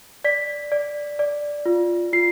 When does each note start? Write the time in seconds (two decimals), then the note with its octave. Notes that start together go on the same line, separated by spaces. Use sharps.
0.24 D5 B6
0.72 D5
1.19 D5
1.66 F4
2.13 F4 C7